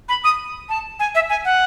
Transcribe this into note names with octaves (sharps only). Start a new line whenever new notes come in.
B5
D#6
A5
G#5
E5
G#5
F#5